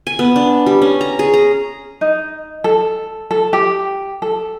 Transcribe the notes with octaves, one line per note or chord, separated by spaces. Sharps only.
G#5
B3
D4
G3
C#4
A#5
G#4
A#5
D#4
A4
A4
G4
A4